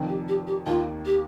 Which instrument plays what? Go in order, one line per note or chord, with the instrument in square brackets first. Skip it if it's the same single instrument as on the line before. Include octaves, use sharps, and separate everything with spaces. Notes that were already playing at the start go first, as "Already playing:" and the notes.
Already playing: [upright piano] F1 F2 D#3
[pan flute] G4
G4
G4
[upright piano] D#2 D#3 A#3 [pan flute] F4
[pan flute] G4